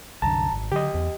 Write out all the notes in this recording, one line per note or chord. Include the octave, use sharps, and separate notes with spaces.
C2 F#2 D3 A5 A#5
G#1
D3 F#3 G4 D#5
E2